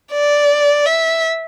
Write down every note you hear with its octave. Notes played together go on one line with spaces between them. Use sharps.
D5
E5